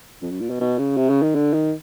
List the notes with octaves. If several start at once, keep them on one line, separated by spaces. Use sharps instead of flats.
F2
F#2
A#2
B2
B2
C#3
C3
C#3
D#3
D3
D#3